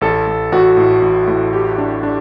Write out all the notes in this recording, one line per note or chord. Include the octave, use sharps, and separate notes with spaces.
A1 A4
A1
A1 F#4
A2
A1
A2
G4
D4
D4